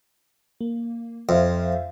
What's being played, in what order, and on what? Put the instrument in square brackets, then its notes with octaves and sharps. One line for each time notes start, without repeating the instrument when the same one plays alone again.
[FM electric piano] A#3
[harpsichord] F2 [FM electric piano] C5 E5 F5